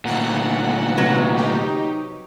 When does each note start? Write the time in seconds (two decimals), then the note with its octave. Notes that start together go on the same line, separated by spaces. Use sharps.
0.05 D2 A#2 F#5
0.97 C3 F#3 B4
1.35 D#4 G4